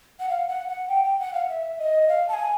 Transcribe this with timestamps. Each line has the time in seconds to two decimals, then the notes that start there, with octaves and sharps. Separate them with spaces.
0.20 F#5
0.29 F5
0.48 F#5
0.68 F#5
0.88 G5
1.04 G5
1.19 F#5
1.33 F5
1.48 E5
1.79 D#5
2.08 F5
2.28 A5
2.33 G#5